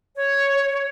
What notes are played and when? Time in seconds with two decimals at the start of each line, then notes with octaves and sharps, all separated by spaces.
0.16 C#5